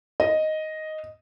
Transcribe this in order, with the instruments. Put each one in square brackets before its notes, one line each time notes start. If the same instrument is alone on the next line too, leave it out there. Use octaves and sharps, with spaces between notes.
[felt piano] D#5